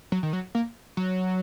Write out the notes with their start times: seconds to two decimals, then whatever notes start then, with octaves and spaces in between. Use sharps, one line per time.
0.12 F#3
0.23 D#3
0.33 F#3
0.55 A#3
0.97 F#3